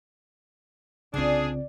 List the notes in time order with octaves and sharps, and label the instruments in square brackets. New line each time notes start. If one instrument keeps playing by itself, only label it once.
[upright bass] C2 F4 [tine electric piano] C#3 C4 [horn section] D4 G#4 [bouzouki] D5 G5